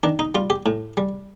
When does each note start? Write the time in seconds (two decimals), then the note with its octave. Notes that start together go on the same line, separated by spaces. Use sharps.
0.03 D#3 D4
0.19 D#4
0.35 G3 F4
0.50 G4
0.66 A2
0.97 G3